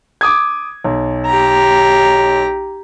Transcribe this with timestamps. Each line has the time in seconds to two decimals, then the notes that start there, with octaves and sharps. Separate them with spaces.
0.21 D6 D#6 G#6
0.84 B1
1.26 G4 A#5